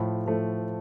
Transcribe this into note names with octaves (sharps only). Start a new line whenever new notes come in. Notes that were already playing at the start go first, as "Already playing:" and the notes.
Already playing: A2 F3 A3 B5
A2 F3 A3